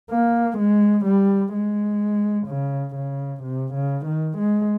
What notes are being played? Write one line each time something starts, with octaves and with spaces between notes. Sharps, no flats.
A#3
G#3
G3
G#3
C#3
C#3
C3
C#3
D#3
G#3